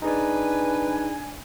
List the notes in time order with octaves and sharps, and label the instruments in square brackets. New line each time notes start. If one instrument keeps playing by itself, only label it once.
[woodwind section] D4 [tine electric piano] D#4 G#4 D5 [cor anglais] B4 [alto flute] G#5